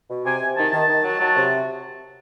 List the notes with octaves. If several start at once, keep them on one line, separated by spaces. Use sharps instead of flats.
B2
C3 G#5
C3
D#3 A5
D#3
D#3
F#3
F#3
C3